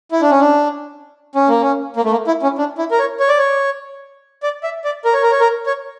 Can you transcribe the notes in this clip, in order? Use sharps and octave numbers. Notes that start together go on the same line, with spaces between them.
E4
D4
C#4
D4
C#4
A#3
C#4
A#3
A3
A#3
E4
C#4
D4
E4
A#4
C#5
C#5
D5
C#5
D5
E5
D5
A#4
C#5
A#4
C#5
A#4
C#5